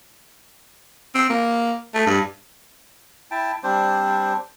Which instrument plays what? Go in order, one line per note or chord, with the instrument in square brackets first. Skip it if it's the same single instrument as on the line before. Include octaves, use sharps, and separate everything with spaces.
[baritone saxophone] C4
A#3
A3
G2
[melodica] E4 G5 A5
G3 C4 D4 C5